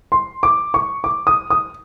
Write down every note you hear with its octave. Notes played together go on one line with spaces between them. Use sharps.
C6
D6
C#6
D6
D#6
D#6